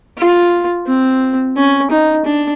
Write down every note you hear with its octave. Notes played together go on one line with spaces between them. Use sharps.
F4
C4
C#4
D#4
D4